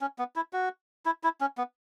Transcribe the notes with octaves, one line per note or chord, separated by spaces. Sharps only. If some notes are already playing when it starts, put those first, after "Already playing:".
C#4
B3
E4
F#4
E4
E4
C#4
B3